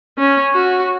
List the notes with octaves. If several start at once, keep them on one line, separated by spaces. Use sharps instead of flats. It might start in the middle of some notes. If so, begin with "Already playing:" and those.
C#4
F#4